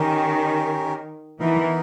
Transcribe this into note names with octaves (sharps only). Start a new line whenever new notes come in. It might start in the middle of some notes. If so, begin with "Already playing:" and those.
Already playing: D#3 C#4 G4 A#4
E3 B3 D#4 A#4